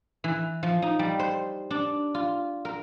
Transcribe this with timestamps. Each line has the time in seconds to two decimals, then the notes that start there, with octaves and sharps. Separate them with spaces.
0.24 E3
0.63 F3
0.82 D#4
0.99 G3
1.19 C5
1.70 D4
2.14 F4
2.65 A#4